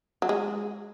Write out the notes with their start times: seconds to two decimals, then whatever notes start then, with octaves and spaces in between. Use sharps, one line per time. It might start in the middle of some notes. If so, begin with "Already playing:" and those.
0.22 F#3
0.29 G#3